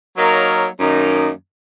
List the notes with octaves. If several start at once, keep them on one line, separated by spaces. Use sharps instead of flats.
F#3 A#3 D#4 A#4 C#5
F#2 D#3 A#3 D#4